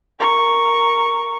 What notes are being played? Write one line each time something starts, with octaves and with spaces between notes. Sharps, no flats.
A#4 C#6